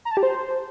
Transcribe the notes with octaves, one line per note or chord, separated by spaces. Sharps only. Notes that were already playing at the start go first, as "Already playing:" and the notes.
A#5
A5
G4
C5